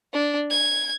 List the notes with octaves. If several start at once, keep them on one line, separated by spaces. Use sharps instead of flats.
D4
G#6